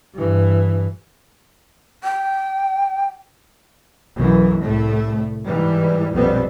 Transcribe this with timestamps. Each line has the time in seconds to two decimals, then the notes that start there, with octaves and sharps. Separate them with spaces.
0.14 G2 E3
2.04 G5
4.15 B1 F#2 E3
4.62 C2 A2 A3
5.45 G#2 E3 G3
6.12 A#1 F2 B2 G3 B3 C4